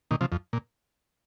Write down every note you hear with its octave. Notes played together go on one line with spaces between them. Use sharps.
A#2 D#3
C3 F3
F2
A#2